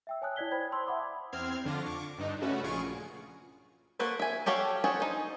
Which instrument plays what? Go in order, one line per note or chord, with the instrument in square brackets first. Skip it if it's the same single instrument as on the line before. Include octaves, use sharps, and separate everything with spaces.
[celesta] E5 G5 E6
C#5 G#5 A5 D#6 F#6
E4 C#5 D5 G#6 B6 G7
C5 G5 B5 G#6
A5 C6 E6
E5 F#5 B5 D6 D#6
[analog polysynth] E2 C4 F6 G#6 C7
F2 D3 D4 F4 A#6
C#6 D6
G2 D4 D#4
C#3 A3 C#4 F#4 B4
A#1 F4 G#4 G#5 C#6 D7
[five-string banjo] A#3 F#4 A4 B4 C5
E5 G#5
F#4 G4 A4 C#5 F5
F#4 G#4 A4 C5 C#5
D#4 C5